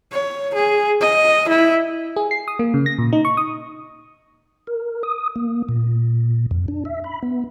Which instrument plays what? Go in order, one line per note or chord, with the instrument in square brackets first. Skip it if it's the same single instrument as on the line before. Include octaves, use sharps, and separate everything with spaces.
[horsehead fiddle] C#5
G#4
D#5
E4
[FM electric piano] G#4
C7
D#6
A#3
C#3
A#6
A#2
D#4
C#6
D#6
[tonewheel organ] A#4
D#6
A#3
A#2
F2
D4
E5
B5
B3